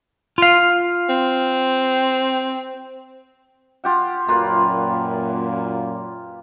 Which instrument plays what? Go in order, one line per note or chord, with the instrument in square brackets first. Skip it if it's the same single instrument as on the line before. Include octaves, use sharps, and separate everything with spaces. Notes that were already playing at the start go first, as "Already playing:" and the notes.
[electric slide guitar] F4 F5
[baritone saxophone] C4
[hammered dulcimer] F4 G4 F#5
[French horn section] F#2 A#2 [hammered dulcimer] A#3 F4 B4